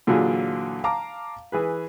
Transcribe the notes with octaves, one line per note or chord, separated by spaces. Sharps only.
A#2 D3 E3 F#3 F4 G#4
F5 A5 A#5 D6
E3 G#4 B4